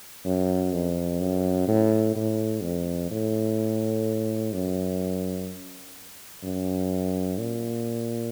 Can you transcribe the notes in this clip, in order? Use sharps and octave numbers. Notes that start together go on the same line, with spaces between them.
F#2
F2
F#2
A2
A2
F2
A2
F#2
F#2
A#2